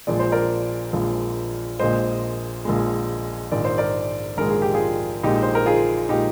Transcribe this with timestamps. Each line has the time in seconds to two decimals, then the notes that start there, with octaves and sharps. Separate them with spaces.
0.07 A#1 A#2 F3 G#3 D5
0.19 C5
0.32 A#4 D5
0.93 A#1 A#2 F3 G#3
1.79 A#1 A#2 G#3 C5 D#5
2.65 A#1 A#2 G#3
3.52 A#1 G#2 D#3 G#3 D5
3.65 C5
3.78 A#4 D5
4.37 A#1 G#2 D#3 G#3 A#4
4.49 G#4
4.62 G4
4.74 F4 G#4
5.23 A#1 A#2 G#3 D#4 G4
5.43 C5
5.55 A#4
5.66 F4 G#4
6.09 A#2 G#3 D#4 G4